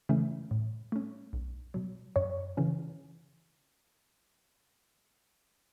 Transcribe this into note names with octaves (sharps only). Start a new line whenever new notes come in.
C#3 E3 A3 C#4
A2
A3 C#4
B1
B2 F#3
F#2 C#5
C#3 E3 C#4